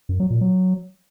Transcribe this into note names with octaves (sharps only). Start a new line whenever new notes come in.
F#2
F#3
A#2
F#3